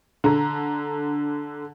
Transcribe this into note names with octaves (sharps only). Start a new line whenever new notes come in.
D3 A#5